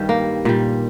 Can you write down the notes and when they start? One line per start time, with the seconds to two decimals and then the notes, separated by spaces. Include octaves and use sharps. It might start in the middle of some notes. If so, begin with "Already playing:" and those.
Already playing: G2 D#3 G3
0.09 A#3
0.45 A#2 G3